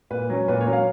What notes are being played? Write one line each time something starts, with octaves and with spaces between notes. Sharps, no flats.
A#2 B4
F#3 C#4
A#2 B4
C#5
F#3 C#4
F5